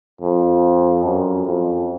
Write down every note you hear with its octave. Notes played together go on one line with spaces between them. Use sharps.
F2
F#2
F2